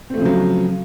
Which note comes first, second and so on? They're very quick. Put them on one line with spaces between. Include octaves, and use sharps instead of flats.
C4 A3 F3 C#3 F#3